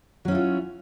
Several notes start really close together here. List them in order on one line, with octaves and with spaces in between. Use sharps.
F#3 C#4 E4 F4